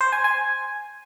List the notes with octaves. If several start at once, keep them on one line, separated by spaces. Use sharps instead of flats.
C5
G#5
G#5